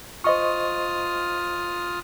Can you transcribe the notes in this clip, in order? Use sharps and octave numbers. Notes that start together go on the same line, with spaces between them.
F4 C5 D#5 C#6 D#6 F6